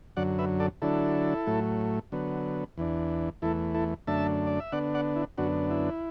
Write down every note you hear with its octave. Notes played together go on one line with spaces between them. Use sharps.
F#2 D3 F#3 D5 F#5
B4 E5
A4 D5
D3 F#3 D4 E4 A4
A2 F#3 A3
D3 F#3 B3
E2 E3 D4
E2 E3 A3 E4 A4
E4 A4
F#2 D3 A3 D4 E5 A5
D5
E5
D3 B3 D4 D5 F#5
D5 F#5
E4
F#2 D3 B3 D4 F#4
E4